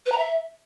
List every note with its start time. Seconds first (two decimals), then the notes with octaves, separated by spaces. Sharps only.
0.06 B4
0.12 A#5
0.18 E5